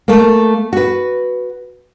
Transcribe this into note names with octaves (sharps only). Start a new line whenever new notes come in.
A3 A#3
F#4 B4